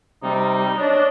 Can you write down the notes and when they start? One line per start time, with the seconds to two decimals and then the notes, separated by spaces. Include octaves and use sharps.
0.23 C3 G3 D#4
0.79 D4 C#5 D#5